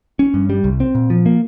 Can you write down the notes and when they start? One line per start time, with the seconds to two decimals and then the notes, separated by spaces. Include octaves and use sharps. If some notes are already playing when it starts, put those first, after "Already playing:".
0.19 C#4
0.34 G2
0.50 G3
0.64 C2
0.80 C4
0.95 A#2
1.10 F3
1.26 A#3